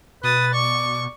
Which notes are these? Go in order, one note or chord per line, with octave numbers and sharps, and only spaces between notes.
B2 B4 D#6 A6
D5 C#6